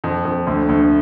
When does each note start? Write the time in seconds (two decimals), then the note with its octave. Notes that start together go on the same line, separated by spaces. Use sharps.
0.04 F2
0.25 F2
0.47 D2
0.69 D2